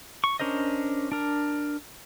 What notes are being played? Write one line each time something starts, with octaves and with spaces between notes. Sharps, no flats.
C#6
C#4 D4 A#4 C5 D#5
D4 A#4